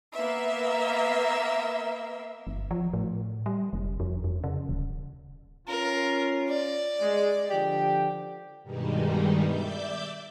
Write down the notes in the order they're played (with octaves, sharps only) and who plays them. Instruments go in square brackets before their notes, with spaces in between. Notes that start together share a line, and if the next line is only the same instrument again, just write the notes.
[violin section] A#3 B3 E5
[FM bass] G1
F3
A2
G3
F1
F2
F2
C#3
D1
[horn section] C#4 F4 [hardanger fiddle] A#4
[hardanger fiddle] D5
[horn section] G#3
D3 F3 G4
[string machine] G2 B2 D#3 G3 G#3 D#4
D5 E5 D6 G6